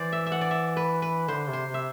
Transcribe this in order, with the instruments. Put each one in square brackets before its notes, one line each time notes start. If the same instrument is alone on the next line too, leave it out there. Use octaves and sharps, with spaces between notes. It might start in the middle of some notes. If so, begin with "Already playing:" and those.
Already playing: [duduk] E3 [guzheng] C5 D5
[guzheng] E5
E5
F#5
D5
E5
B4
B4
[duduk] D3 [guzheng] C5
[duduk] C3
[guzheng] C5
[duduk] C3
[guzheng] E5